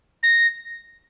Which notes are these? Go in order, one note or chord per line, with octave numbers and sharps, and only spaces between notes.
A#6